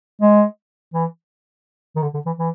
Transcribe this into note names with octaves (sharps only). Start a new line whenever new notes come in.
G#3
E3
D#3
D3
D3
E3
E3